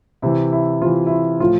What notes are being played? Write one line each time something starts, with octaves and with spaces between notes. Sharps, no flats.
C3 E3 E4
E4
C3 F4
E3
E4
F4
A2 F3 F4